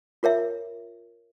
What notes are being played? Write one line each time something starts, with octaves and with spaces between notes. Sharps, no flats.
F4 A#4 C#5 E5